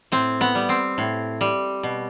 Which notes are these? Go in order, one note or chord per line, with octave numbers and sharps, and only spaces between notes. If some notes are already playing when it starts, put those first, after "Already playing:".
A2 C4
B3
G3
C4
A2
G3
B2